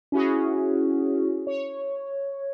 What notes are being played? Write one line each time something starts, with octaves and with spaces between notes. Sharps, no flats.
C#4 E4 F#4 G#4
C#5